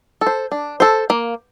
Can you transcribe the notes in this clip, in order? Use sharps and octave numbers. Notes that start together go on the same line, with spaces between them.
A4
C5
D4
A4 C5
A#3